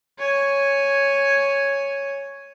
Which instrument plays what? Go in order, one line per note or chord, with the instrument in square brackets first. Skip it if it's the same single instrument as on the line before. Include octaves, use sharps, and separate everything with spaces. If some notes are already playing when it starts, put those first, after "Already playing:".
[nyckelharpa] C#5 G#5